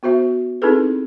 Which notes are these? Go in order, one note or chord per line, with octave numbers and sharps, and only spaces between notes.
B3 F#4 C5 E5
C4 D#4 E4 G#4 A4 B4